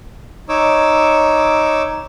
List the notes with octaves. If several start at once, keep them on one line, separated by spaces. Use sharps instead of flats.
D#4 C#5 D6 E6